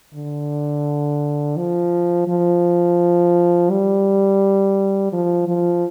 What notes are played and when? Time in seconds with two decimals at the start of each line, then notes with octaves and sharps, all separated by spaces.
0.14 D3
1.57 F3
2.28 F3
3.71 G3
5.13 F3
5.48 F3